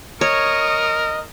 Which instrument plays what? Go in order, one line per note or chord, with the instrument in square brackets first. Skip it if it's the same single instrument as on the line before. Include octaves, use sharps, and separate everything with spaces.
[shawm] A#4 [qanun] C#5 [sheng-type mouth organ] D#5 [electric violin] C#6 D#6